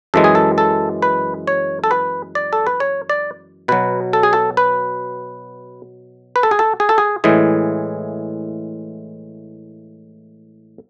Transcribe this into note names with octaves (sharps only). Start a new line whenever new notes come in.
F#2 E3 G#3 A4
G#4
A4
A4
B4
C#5
A4
B4
D5
A4
B4
C#5
D5
B2 F#3 B4
A4
G#4
A4
B4
B4
A4
G#4
A4
G#4
A4
G#4
A2 E3 G#3 G#4